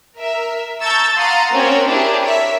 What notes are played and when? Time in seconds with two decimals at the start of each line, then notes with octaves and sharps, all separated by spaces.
0.17 A#4 E5
0.81 A5 A#5 C#6 E6 G6 A6
1.16 F5 F#5 A#5 C6 D#6 A6
1.52 A#3 C4 C#4 F#4 C#5 G5
1.88 D4 E4 G4 G#4 A#4
2.23 A#4 C#5 E5